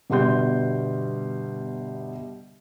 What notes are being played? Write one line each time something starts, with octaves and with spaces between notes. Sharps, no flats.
G1 B2 G3 C6 G6